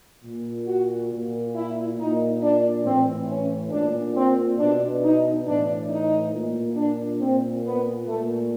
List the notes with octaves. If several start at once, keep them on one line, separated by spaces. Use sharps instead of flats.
A#2
F#4
A#2
E4
A#2 D#4
D4
A2 E3 C4
C#4
A#2 D4
C4
B2 D4
D#4
A2 E3 D4
D#4
A#2
D4
A#2 C4
B3
A#2 A3